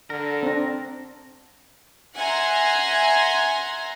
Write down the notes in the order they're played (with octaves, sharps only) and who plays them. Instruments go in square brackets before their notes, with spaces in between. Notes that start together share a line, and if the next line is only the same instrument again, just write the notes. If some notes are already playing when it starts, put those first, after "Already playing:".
[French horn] D3 [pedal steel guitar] A#4
[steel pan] C4 D4
[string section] E5 F#5 G#5 A#5 C6